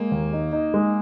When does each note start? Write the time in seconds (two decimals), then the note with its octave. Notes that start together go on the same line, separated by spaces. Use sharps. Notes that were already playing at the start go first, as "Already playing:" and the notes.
Already playing: G#3 A#3
0.12 D#2
0.33 D#4
0.53 D#4
0.74 G#3